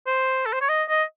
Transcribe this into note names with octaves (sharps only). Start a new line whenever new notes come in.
C5
A4
C5
C#5
D#5
D#5